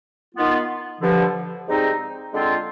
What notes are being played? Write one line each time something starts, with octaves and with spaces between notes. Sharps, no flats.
D#3 B3 F4
G2 D3 F3
G#2 G3 C4 D#4
D3 G#3 C4 F4